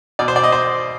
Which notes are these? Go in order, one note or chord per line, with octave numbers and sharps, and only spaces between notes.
B2 D5
C5
D5
D#5
C5